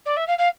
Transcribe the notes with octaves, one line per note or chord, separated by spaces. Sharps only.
D5
E5
F5
F5